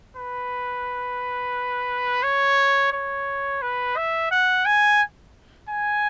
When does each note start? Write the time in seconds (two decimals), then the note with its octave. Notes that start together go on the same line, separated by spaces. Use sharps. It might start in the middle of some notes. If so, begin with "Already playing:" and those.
0.16 B4
2.23 C#5
2.93 C#5
3.62 B4
3.97 E5
4.31 F#5
4.66 G#5
5.69 G#5